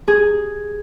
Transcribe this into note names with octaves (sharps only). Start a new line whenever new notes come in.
G#4